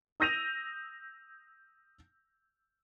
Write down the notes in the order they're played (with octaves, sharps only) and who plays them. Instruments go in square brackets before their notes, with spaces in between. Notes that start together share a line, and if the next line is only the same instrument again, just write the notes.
[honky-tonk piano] D#6 E6 G6 A#6 D#7 F7